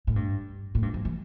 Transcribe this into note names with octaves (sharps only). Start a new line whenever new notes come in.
A2
G2
A2
G2
F3
E3